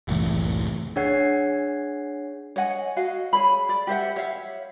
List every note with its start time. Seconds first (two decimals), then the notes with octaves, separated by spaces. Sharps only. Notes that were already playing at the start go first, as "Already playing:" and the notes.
0.08 F#1 C2 A2 E3
0.96 D4 G#4 C#5 F#5 G#6 C7
2.56 C#5 D#5 F#5 G#5
2.96 F#4 D#5 F5
3.33 G#4 C#5 B5
3.69 D5
3.87 G4 C5 E5 F#5
4.16 C#5 E5 F5